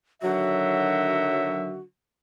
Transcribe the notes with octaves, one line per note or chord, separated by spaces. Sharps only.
D3 D#3 F#3 F#4 E5